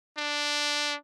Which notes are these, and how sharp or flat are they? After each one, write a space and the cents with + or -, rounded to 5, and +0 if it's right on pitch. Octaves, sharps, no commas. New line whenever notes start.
D4 +0